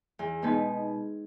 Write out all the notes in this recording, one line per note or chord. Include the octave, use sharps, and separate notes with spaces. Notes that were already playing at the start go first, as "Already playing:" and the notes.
E2
B2 G#3 B3 D#4